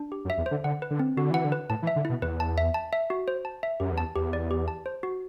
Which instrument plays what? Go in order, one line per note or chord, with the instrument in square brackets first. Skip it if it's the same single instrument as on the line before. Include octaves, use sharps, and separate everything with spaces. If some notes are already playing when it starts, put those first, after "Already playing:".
Already playing: [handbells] D4
G4
[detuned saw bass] F#2
[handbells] E5
[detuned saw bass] E2
[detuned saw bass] D3 [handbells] C5
[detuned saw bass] D3 [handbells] F#5
[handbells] B4
[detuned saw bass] D3
[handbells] C4
[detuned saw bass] D3 [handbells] F#4
[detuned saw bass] E3 [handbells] F#5
[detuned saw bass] D3
[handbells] B4
[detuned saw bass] A2 [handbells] A5
[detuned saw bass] E3
[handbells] E5
[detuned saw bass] D3
[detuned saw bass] B2 [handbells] E4
[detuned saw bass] E2 [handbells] B4
[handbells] A5
E5
A5
E5
F#4
C5
A5
E5
[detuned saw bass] F#2 [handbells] G4
[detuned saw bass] E2
[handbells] A5
[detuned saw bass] E2 [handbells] G4
[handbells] D5
G4
A5
C5
F#4